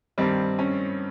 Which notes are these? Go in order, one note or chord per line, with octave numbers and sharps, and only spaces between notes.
G2 D#3 G3 C4
C#4